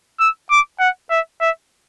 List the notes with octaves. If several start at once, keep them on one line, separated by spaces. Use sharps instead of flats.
E6
D6
F#5
E5
E5